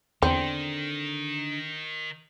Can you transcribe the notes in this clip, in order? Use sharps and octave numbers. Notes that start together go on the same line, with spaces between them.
E2 D3 D#3 C4